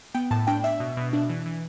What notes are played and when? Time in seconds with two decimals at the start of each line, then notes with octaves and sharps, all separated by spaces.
0.14 B3 G5
0.31 A2 A5
0.47 D4 G5
0.64 D4 E5
0.80 B2
0.97 B2
1.13 D4
1.29 E3
1.46 E3